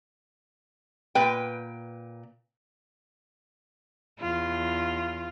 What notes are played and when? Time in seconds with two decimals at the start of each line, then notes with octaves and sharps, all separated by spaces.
1.15 A#2 B4 G5
4.19 E2 F4